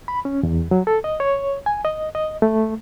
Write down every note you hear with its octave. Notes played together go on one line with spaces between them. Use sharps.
B5
C#4
E2
F#3
A4
D#5
C#5
G#5
D#5
D#5
A3